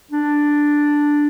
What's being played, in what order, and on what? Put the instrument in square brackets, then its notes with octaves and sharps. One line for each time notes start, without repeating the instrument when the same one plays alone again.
[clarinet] D4